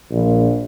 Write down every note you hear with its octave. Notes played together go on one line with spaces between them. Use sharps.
A#1